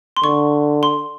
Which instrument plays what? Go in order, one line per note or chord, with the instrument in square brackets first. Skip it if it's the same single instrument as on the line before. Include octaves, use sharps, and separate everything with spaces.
[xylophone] C6
[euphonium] D3 [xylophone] C#6
[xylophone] C6